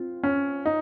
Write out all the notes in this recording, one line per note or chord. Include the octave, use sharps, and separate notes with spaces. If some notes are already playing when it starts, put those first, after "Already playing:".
Already playing: C4 F4
C#4
D#4